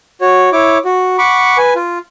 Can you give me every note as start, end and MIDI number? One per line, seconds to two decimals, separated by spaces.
0.21 0.50 66
0.21 0.50 73
0.53 0.78 64
0.53 0.78 73
0.53 0.78 86
0.85 1.17 66
1.19 1.58 78
1.19 1.58 83
1.19 1.58 85
1.19 1.58 86
1.58 1.74 71
1.58 1.74 80
1.76 1.98 65